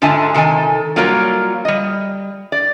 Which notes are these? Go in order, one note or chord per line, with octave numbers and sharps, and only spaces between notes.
G#2 D3 F4 E5 G#5 A5
C3 D#3 A4 G#5
F#3 G3 A#3 F4 A#4 C#5
G3 D#5
D5